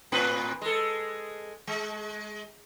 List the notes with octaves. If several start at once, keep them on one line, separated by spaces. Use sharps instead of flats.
A2 C4 B4
G#3 A4
G#3